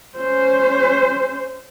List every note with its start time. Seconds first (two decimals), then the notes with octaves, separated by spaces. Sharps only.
0.17 C#4 C5